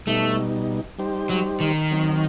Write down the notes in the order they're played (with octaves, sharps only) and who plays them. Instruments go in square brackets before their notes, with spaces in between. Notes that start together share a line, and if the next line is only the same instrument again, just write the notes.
[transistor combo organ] B2 G3 D#4 [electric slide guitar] A3
[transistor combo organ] G3 D#4 G4 C5
[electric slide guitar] F#3
D#3
[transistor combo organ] F#3 C4 D#4